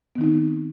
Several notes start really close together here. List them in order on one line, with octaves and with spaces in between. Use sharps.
B3 D#3 D#4 C4